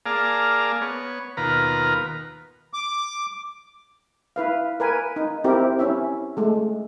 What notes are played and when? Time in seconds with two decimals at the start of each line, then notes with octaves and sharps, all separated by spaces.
0.06 A#3 G#4 D5 F5 A5 A#5
0.81 B3 C#5
1.37 D#2 B2 F4 A#4 B4 A#5
2.73 D6
4.36 E4 B4 F5
4.80 A#4 B4 G#5
5.16 D#4
5.44 C4 E4 G4 A#4
5.79 C#4 E4 E5
6.37 G#3 A3